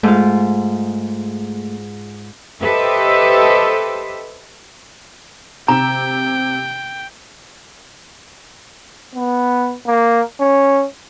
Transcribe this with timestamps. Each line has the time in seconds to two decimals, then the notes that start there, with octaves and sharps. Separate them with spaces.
0.03 G#2 A3 F4
2.62 G4 A4 B4 C5 D#5 E5
5.68 C3 G5 A#5
9.15 B3
9.87 A#3
10.40 C#4